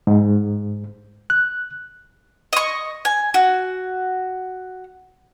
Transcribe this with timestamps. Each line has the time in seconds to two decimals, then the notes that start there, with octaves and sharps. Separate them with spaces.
0.07 G#2
1.30 F#6
2.53 D#5 C#6
3.05 G#5
3.34 F#4